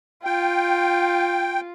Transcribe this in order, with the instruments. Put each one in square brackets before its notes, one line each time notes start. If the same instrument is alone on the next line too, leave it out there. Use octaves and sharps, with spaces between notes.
[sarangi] F4 [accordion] G5